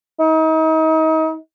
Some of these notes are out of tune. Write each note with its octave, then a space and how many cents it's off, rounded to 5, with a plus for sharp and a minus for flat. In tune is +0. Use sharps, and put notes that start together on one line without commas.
D#4 +35